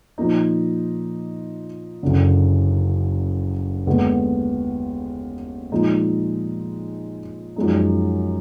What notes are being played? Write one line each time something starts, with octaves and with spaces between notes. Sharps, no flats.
A#2 F3 A#3 D#4
F#1 F#2 D3
D#2 D3 G#3 B3
A#2 F3 G#3 D#4
F#2 F3 G#3 D#4